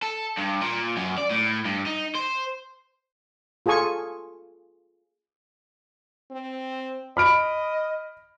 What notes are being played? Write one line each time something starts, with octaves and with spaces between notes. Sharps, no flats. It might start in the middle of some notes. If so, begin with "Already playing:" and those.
A4
G2
A#2
F#2
D5
A2
G2
D#4
C5
F4 G#4 A4 G#5 C#6
C4
D#5 B5 F6 D7